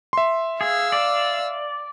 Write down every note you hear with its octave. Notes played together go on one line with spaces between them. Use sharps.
E5 C6
G#4 F5 E6
D5